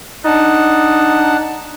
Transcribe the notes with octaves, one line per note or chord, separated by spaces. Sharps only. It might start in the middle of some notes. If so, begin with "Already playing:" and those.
D4 D#4 F#5 A5